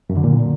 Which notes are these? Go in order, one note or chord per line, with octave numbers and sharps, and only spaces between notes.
F#2
D3
A#2